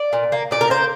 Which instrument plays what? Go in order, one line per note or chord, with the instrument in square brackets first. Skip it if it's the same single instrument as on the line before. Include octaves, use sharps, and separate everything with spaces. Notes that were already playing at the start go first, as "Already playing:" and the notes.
Already playing: [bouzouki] D5
A#2
A#3
A#2 D5
A#4
A#3 C5